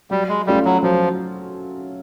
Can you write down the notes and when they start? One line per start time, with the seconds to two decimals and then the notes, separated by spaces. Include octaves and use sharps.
0.11 F#3 G3
0.29 G#3
0.47 G3 A3 C#4 F4
0.65 F#3
0.83 F3 F#3